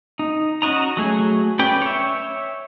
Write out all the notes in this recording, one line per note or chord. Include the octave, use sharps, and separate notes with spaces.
D#4
C#4 F#4 D#5 A#5
F#3 A3 G#4
C#4 B4 D5 G5
C#5 E5